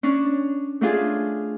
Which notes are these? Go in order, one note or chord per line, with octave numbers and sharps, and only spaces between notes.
C#4 D4
A3 D4 F4 G#4